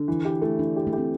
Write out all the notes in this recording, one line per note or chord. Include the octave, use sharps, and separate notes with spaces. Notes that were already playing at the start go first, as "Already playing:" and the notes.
Already playing: D3
E3
G4
A3 E4
E3 D4
G4
A3
C4 G4